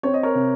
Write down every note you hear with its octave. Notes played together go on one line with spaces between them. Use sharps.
C4 C#5
D#5
A#4 C#5
C3